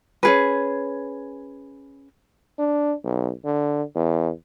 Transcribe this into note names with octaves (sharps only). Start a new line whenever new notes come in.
C#4 G#4 B4
D4
B1
D3
E2